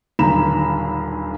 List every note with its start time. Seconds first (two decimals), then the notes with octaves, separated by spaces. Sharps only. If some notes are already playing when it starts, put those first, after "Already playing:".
0.19 D#1 B1 D3 A#5 B5 E7